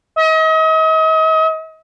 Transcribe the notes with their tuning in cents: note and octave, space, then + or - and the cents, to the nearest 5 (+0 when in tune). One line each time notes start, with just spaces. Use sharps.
D#5 +40